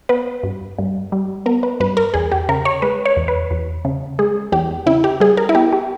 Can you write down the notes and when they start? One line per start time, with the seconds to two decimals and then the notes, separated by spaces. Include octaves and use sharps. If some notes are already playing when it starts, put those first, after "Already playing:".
0.09 B3 B4
0.43 G2
0.79 G2
1.12 G3
1.46 B3 A#4
1.63 B4
1.80 G2 B4
1.97 A#4
2.14 E2 G#4
2.32 G4
2.49 C#3 A#4
2.65 C#5
2.82 G#3 B4
3.06 C#5
3.17 E2
3.28 B4
3.51 E2
3.85 C#3
4.19 G#3 G#4
4.52 E2 G4
4.86 C#3 E4
5.04 G4
5.20 G3 G#4
5.37 A#4
5.49 E4
5.55 B3 G4
5.73 G4